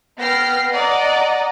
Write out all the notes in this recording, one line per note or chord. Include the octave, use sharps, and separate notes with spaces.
B3 G5 F6 A#6 C7
D5 D#5 F#5 A#5